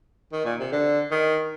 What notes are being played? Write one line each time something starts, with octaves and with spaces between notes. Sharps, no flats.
D#3
A#2
C3
D3
D#3